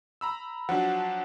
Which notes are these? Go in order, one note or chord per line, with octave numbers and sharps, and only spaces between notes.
A#5 B5 E6
F3 F#3 D4 F#5